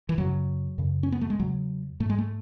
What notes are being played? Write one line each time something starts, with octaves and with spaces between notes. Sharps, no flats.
E3
F#2 C#3 F#3
F#2 C#3
C#4
B3
A3
G#3
E2 C#3 F#3
G#2 A3
G#3
A3